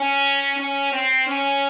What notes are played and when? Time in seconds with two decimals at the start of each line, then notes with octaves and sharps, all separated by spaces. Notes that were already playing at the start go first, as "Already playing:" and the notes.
Already playing: C#4
0.57 C#4
0.93 C4
1.27 C#4